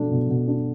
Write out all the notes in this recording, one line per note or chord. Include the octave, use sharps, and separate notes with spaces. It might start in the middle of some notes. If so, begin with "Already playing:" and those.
Already playing: B2 A3 D4
B2
B2
D4